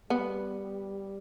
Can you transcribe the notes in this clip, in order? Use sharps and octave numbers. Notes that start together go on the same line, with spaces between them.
G3 B3